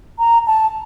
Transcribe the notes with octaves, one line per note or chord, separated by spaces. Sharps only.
A#5
A5